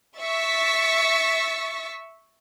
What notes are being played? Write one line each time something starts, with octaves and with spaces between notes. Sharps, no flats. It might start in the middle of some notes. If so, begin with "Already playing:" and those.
E5 C#6 E6 A6 B6